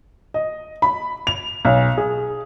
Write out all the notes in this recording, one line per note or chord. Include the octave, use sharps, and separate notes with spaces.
D#5
B5
F7
B1
G#4